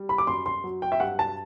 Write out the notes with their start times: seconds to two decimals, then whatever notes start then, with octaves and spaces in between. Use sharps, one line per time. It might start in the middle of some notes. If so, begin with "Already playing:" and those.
Already playing: G3
0.09 B5
0.18 D6
0.27 F#2 C6
0.46 C6
0.64 F#3
0.82 G5
0.92 E5
1.00 G2 F#5
1.19 A5